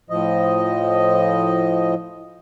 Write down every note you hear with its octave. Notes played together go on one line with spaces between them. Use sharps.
A2 F3 D#5